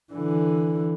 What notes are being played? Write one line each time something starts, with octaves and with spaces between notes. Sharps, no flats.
D3 E3